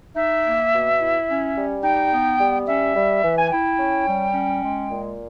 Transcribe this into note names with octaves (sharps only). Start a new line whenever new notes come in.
D#4 E5
A#3
B2
E4
C#4
G3
D#4 G5
B3
G3
C#4 E5
G3
E3
G#5
E4 G5
C#4
G3
C#4
G#3
A#2